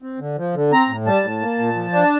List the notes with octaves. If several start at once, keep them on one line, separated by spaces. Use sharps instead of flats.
C4
D3
F3
D3
C4 A#5
A2
G3 A5
A2
A#3
A#2
F3
D4